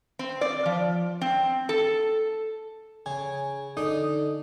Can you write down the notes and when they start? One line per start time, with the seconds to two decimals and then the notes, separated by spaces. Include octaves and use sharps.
0.19 C4
0.41 D5
0.66 F3
1.21 C4
1.69 A4
3.06 C#3 G#5
3.77 D3 D4 D#4